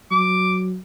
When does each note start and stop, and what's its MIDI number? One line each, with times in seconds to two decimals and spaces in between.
0.11 0.78 54
0.11 0.60 86